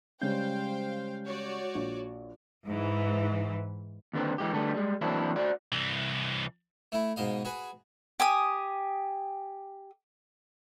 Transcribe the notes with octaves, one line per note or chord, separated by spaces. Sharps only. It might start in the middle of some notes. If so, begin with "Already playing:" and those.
C#3 G3 G#3 C5 F5 G5 G6
F#4 C#5 D5
A#1
G#2 E3
D#2 D3 B3 C4
E3 G#3 G4
D3 G3 A3 B3
G3 G#3
E3 F#3 A#3 C4 D4 E4
F#4 C5 D5 F#5
C2 E3
A3 E4
G#2 B2 D#5 F5
F#4 G#4 B4
G4 G#5 D#6